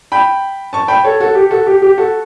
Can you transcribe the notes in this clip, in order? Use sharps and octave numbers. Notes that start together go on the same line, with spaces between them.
G5 B5
A5 C#6
G5 B5
A4 C#5
F#4 A4
G4
F#4 A4
G4
G4
F#4 A4